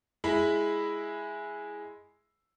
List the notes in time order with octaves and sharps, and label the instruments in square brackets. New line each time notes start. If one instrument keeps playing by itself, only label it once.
[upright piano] G#3 E4 B5